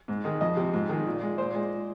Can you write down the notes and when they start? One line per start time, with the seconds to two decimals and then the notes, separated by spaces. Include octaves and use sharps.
0.08 G#2
0.24 D#3 G#3
0.41 F2 D#5
0.57 C3 F3
0.74 G#2
0.89 D#3 G#3
1.06 A#2
1.22 G#3
1.38 A#2 C5
1.55 G#3